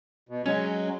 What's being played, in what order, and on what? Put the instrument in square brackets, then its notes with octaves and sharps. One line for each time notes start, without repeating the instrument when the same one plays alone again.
[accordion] B2
[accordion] F#3 G#3 [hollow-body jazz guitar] C#4